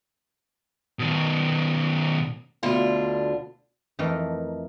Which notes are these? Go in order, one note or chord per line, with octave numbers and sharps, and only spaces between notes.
B2 D#3
D2 B2 D3 D4 F4
F2 E3 A3 D#4 A#4 A#5